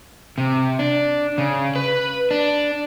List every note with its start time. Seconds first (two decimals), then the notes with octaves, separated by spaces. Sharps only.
0.38 C3
0.79 D4
1.38 C#3
1.76 B4
2.31 D4